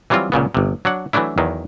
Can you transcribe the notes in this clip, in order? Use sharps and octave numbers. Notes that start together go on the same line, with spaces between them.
E3 F#3 G3 C4 F4
C#2 A#2 C#3 B3
G1 C3
F#3 D4 F#5
E3 F#3 A3 D4 E4
E2 D#3 F#3